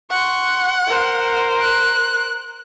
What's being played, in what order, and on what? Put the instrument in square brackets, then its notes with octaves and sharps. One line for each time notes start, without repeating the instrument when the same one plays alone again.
[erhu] F#5 [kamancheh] C6 C#6
[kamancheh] A#4 C5
[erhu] F#6